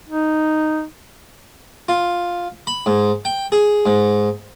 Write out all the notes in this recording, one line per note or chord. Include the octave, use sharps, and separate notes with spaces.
D#4
F4
B5
G#2
G5
G#4
G#2